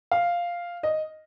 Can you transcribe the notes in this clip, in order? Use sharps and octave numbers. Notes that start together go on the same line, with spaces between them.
F5
D#5